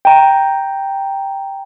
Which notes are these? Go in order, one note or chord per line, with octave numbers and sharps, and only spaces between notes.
G5 A#5